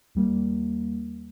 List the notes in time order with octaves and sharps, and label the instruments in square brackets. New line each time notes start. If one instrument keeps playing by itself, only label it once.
[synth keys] D#2 G3 A#3